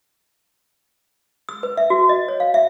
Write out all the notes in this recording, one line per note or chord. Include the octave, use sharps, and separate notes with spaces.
E6
B4
E5
F#4
D#5
C#5
F5
E5